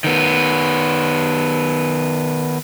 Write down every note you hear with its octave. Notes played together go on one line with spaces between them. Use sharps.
D#3 B3